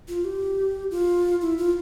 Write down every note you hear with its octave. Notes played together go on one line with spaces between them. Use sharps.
F4
G4
F4
E4
F4